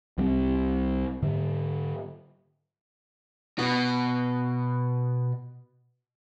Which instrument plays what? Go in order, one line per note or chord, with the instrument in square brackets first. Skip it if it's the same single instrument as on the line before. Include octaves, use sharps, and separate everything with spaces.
[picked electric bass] C2 G3 C4
G#2 D3
[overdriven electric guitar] B2 F#4